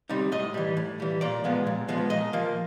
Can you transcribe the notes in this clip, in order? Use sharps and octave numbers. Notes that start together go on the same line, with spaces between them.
G3 C4 D#4
A2 D#5
E3 G3
A2
E3 G3
A#2 D5
F3 G#3 B3
A#2
F3 G#3 B3
A#2 D#5
F3 A#3